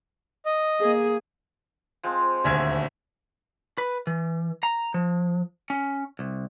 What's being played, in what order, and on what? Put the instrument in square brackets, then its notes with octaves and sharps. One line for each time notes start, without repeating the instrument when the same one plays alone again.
[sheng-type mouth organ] D#5
[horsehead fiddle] A#3 G#4
[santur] F3 G#3 C4
[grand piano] D#1 D2 G#6 [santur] A#4 E5 G#5
[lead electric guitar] B4
E3
A#5
F3
C#4
C2